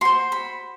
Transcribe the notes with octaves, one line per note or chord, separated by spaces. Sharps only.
F#4 C5 C6
B5